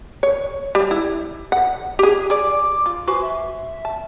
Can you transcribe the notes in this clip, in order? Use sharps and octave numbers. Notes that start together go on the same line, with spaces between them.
C#5
G3
E4
F#5
G4 G#4
G#4 D5 D6
F4
F#4 B4 C5 G#5
E5
A5